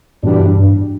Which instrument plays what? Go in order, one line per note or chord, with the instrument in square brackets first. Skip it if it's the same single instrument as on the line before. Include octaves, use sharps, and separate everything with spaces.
[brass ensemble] E2 B2 G3 B3 D4 [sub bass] G#2
[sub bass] G2